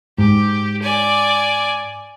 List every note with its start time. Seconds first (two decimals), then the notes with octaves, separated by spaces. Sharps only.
0.18 G#2 G4
0.82 D5 G#5